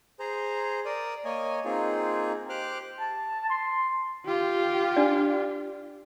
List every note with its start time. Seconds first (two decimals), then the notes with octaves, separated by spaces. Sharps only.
0.20 G#4 C5 A#5
0.85 A#4 D5 D#6
1.25 A#3 C#5 D#5 G#5
1.65 A#3 C4 D#4 F4 G#4
2.49 G4 C5 D6 F6 F#6
3.00 A5
3.50 C6
4.26 F4 G4
4.96 D4 D5